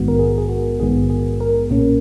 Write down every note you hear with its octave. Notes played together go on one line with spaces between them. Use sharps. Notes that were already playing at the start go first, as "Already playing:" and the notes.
Already playing: A#1 G#2 D#3 G#3 B3 F#4
A#4
G#4
G#4
F#4
A#1 G#2 D#3 G#3 B3 G#4
G#4
A#4
B1 A#2 A#3 C#4